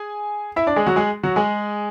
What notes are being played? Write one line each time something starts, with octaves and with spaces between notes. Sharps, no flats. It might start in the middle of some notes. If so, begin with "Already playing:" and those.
Already playing: G#4 G#5
E4 E5
D4 D5
G#3 G#4
F#3 F#4
G#3 G#4
F#3 F#4
G#3 G#4